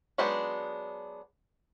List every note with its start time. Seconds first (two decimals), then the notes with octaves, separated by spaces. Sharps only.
0.18 F#3 G#3 B3 D4 D#4